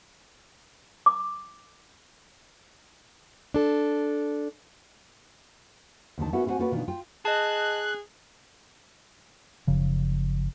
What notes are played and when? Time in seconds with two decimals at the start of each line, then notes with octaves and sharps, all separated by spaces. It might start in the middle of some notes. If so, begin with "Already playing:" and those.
1.06 D6
3.54 D4 A4
6.18 D#2 D3 D#3 A5
6.33 B3 C#4 E4 F#4 A4 A#4
6.46 C4 E4 F#4 C5 F#5 G#5
6.59 A#3 C#4 F4 F#4 A4 B4
6.71 B2 D#3 E3 D4 F4
6.88 F4 G5
7.25 G#4 D#5 A5 F#6
9.67 F#1 C#3 F3